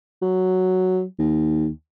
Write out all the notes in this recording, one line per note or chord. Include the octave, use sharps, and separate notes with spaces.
F#3
D#2